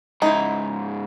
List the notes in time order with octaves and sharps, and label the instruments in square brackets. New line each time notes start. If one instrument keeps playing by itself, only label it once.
[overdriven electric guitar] G#2 C#3 [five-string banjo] D#4 E4